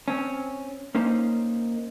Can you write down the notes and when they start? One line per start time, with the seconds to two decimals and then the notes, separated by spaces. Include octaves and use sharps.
0.08 C4 C#4
0.95 A#3 C#4 D#4 C5